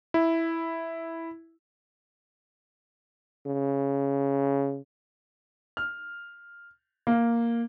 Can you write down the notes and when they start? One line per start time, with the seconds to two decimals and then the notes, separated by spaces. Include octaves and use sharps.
0.14 E4
3.46 C#3
5.77 F6
7.07 A#3